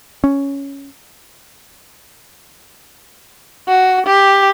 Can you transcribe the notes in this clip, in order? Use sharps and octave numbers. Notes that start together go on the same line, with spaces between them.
C#4
F#4
G4